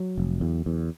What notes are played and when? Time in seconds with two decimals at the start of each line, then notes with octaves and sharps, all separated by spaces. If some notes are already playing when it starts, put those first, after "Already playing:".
Already playing: F#3
0.18 F1
0.41 E2
0.66 E2